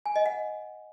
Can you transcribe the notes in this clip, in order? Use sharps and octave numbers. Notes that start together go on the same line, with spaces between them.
G#5
D#5
F#5